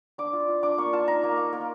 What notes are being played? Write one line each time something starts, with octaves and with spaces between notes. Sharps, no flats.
D4 D6
F4
F4
D4 D6
A#3 C#6
F4 A5
D#4 A#5
A#3
A#3
A#3